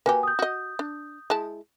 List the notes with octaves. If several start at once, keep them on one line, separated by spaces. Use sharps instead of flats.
A#3 F#4 G4 B4 G#5
D#6 G6
F#4 D#5
D4
G#3 E4 A5